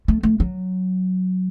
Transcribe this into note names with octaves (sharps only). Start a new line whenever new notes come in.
A3
A3
F#3